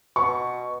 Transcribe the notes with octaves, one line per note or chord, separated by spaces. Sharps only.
B2 C#6